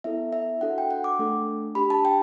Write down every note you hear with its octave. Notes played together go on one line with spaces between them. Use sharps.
B3 E4 A4 E5
E5
D4 F#4 A4 F#5
G5
F#5
D6
A3 D4 A4
D4 G4 B5
A5
G5